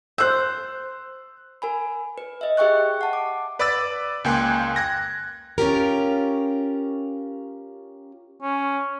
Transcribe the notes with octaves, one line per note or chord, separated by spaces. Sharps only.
C5 E6 F#6 G6
A#4 G#5 B5
B4
D#5 E5
G4 G#4 E5 G5 C#6 F#6
F#5 A5
D6
B4 D5 B5 D6 E6 A6
C#2 A#3 G5 G#5 C6 F#6
F#6 G#6 A#6
C#4 F4 G4 A#4
C#4